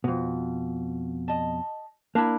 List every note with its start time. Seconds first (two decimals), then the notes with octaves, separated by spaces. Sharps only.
0.04 F2 B2
1.28 D#5 A5
2.15 A#3 D4 E4